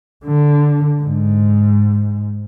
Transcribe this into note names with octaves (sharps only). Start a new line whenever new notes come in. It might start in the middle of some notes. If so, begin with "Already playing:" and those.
D3
G#2